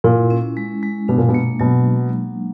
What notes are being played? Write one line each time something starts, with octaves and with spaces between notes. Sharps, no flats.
A#2 E4
C#4
G#3
G#3
B2 D4
A#2
B2
A#3
B2 F#3